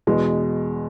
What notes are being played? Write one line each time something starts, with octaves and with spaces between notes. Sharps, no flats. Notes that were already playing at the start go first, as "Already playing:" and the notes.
E2 B2 G#3